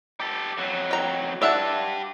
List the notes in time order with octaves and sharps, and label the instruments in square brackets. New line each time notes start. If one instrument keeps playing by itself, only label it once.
[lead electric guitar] G4 A4
F2 F#3
[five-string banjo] G5 A#5
[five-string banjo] D4 E5 F#5 [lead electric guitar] G4 A5